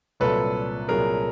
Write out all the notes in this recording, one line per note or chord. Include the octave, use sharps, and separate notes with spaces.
C2 A#2 F#3 A4 B4
C2 A#2 F#3 G#4 A#4